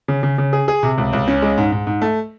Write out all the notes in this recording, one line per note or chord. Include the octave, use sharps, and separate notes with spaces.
C#3
C#3
C#3
G#4
G#4
C3
C#2
C#2
C#4
G#3
G#2
G#2
G#2
A3